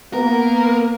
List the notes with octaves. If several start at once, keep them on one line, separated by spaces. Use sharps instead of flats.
A#3 B3 A#4